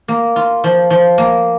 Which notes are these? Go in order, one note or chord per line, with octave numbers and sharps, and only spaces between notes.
A#3
F4
F3
F3
A#3